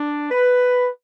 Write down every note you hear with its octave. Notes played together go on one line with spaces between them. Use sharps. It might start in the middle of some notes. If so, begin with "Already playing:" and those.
Already playing: D4
B4